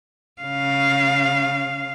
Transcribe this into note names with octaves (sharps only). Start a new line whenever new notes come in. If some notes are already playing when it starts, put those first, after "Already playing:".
C#3 F5